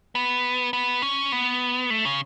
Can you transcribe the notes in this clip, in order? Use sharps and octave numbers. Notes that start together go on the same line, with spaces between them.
B3
B3
C#4
B3
A3
C#3